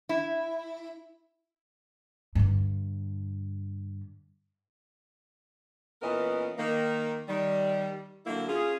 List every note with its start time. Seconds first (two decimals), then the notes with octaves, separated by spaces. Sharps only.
0.09 E4
2.35 G2 D3
6.02 A#2 E3 B3 C#4 A#4 D#5
6.58 D#3 A#3
7.29 D#3 G3
8.26 D3 F#3 A#3 E4
8.48 C#4 F4 G#4